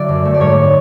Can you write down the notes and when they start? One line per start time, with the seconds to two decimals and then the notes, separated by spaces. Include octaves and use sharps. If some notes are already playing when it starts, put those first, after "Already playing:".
Already playing: D3 F#3 D5 E5
0.09 F#2
0.25 A3
0.34 D5
0.40 G#2 C#5